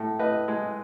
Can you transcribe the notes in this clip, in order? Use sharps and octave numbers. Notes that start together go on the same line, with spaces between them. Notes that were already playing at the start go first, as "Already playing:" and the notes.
Already playing: A2 A4
A2 B4 D#5
G#3